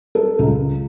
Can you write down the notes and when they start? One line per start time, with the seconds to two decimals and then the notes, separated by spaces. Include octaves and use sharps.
0.15 A4
0.39 C#2